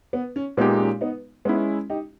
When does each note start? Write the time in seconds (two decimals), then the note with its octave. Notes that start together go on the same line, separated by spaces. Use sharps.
0.13 B3
0.36 C#4
0.57 A#2 G#3 B3 D#4 G4
0.80 C#4
1.01 B3 D#4
1.45 G#3 B3 C#4 D#4 E4
1.90 D#4 G4